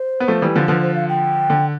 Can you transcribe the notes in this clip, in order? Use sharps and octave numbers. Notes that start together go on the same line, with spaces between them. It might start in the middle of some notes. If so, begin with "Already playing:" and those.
Already playing: C5
B3
F3 A3
E3 G3
D3 F3
D3 F3 B4
C5
F5
G5
D3